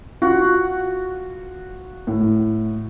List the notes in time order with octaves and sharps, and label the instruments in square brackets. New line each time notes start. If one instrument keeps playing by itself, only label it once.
[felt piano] F4 [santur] F#4
[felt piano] A2